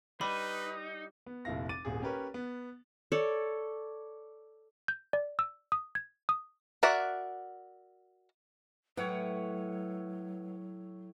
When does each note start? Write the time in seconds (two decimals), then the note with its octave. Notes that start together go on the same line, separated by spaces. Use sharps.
0.21 G3 D#4 B4 B5
1.26 B3
1.45 F1 A#1 E4 F5 A#6
1.69 D6 A6 D#7
1.85 D#1 G#1 G#4
2.02 C#4 G4 A#4 B4 C#5
2.34 B3
3.12 A4 C#5 D5
4.88 G6
5.13 D5
5.39 E6
5.72 D#6
5.95 G#6
6.29 D#6
6.83 F#4 A#4 D5 E5 F#5
8.97 A2 F#3 B4 C#5 F#5 G5